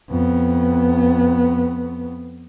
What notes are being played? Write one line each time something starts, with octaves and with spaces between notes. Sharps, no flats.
F2 B3